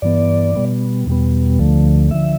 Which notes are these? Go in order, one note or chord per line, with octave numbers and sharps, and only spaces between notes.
G2 E3 B3 D5
B2 G3 B3
E2 B2 G3 B3
D2 D3 F3 A3
D3 F3 E5